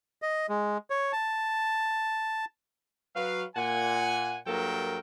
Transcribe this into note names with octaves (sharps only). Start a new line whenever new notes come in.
D#5
G#3
C#5
A5
F#3 B4 F5
A#2 F#5 G#5
G2 F#3 A#3 A4 A#4 G5